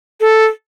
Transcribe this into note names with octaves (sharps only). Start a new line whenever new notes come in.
A4